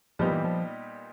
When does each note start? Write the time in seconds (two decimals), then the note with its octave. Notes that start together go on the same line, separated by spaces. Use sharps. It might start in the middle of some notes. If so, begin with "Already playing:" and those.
0.19 A#2 F3 G3 B3 D#4 G4
0.32 E3
0.44 F3